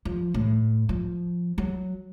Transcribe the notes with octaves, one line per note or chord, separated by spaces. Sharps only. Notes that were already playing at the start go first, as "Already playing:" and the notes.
F3
A2
F3
F#3